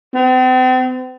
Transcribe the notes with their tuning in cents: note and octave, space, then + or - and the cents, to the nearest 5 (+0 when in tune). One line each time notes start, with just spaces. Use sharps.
C4 -40